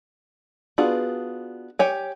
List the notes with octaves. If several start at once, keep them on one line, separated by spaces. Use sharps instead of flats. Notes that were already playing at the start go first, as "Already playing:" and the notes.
B3 D4 F4 F#4 G#4
G4 C#5 G#5